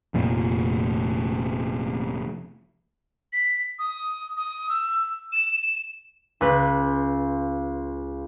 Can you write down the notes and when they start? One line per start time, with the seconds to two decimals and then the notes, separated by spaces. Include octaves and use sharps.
0.14 F1 F2 A#2
3.33 B6
3.79 D#6
4.37 D#6
4.69 E6
5.32 E7
6.41 C#2 B4